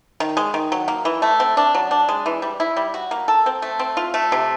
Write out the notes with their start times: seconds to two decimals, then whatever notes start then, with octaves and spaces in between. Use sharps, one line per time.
0.20 D#3
0.37 G#3
0.54 D#3
0.72 F#3
0.88 A#3
1.05 E3
1.22 A3
1.40 C4
1.57 D4
1.75 F#3
1.91 D4
2.09 G#3
2.26 E3
2.42 G3
2.60 E4
2.77 G3
2.94 F#4
3.11 A#3
3.28 A4
3.46 C4
3.62 A3
3.79 C4
3.97 F4
4.14 A3
4.32 C3